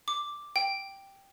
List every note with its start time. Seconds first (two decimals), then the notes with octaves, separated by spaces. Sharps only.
0.08 D6
0.56 G5